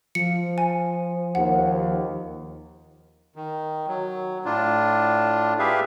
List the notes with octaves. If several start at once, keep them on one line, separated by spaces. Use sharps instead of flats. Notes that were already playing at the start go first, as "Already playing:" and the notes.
F3 C#7
G#5
D#2 F#5
D#3
F#3
A2 D4 F4
G4 G#4 B4 E5 F5